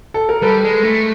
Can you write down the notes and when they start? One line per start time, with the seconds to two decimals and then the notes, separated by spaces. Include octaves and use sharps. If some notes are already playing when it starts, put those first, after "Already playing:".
0.14 A4
0.29 A#4
0.42 G3 A4 B4
0.64 G#3
0.84 A3